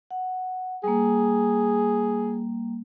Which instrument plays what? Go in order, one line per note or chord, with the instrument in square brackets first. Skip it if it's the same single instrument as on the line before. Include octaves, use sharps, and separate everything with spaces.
[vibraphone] F#5
[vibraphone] G3 A#3 [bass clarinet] G#4